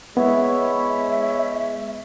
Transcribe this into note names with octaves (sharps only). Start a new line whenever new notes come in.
G#3 B3 E4 C#5 E5